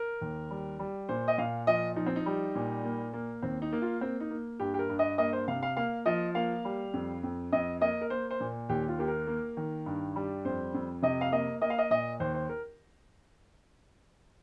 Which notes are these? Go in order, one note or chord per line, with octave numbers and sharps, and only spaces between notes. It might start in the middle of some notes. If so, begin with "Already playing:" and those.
Already playing: A#4
D#2
G3
G3
A#2 C5
D#5
A#2 F5
F3 D#5
F3 D#4
C4
D#4
G3
A#2
A#3
A#3
D#2 C4
D#4
A#3
F4
A#3 C4
D#4
A#3
G2 G4
G4
A#4
G2
D#5
A#3 D#5
C5
C3 F5
F5
A#3 F5
F3 D#5
A#3 F5
G3
F2
F2
F2 D#5
A#3 D#5
A#4
A#3 C5
C5
A#2
D#2 G4
F4
A#3 G4
A#4
A#3
D#3
G2
G3
F2 C5
F2
C3 D#5
F5
A#3 D#5
A#3 D#5
F5
D#5
A#2 D#5
D#2 C5
C5
A#4